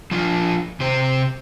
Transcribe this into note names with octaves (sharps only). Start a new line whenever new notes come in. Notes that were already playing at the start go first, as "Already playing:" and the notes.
F3 D4 F4
C3 C5